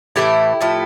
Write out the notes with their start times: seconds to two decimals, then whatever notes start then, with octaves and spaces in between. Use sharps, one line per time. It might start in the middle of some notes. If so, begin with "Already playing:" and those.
0.16 A2 E3 A3 E4 G4
0.61 A2 F3 A3